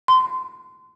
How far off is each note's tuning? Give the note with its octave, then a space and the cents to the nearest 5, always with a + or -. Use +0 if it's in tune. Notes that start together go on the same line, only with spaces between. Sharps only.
C6 -25